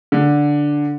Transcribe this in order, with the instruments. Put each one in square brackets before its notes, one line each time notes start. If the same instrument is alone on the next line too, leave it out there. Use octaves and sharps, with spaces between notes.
[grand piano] D3